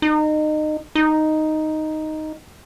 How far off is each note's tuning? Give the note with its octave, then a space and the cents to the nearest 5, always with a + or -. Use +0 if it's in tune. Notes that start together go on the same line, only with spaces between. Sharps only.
D#4 -25
D#4 +0